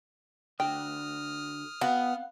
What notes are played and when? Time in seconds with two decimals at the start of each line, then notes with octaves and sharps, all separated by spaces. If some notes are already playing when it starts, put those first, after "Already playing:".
0.60 D3 F#4 G5 D#6 F6
1.81 B3 F#4 F5 F#5